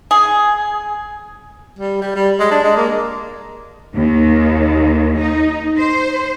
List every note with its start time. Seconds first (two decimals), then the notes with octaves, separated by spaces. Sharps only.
0.11 G#4
1.79 G3
2.02 G3
2.16 G3
2.40 G#3
2.51 D4
2.64 G#3
2.77 A#3
3.94 D#2
5.20 D#4
5.76 C5